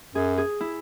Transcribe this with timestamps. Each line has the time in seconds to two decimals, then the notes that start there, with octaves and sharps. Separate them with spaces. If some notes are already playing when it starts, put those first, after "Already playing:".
0.14 F#2 G#4
0.38 G#4
0.60 E4